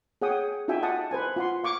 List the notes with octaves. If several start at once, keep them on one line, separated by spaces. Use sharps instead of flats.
G#4 C#5 F#5 G5 D#6
D#4 F4 F#4 E5 G5 G#5
D#5 F#5 A5 D#6
B4 C5 G#5
F4 F#5 C6
F5 C#6 D6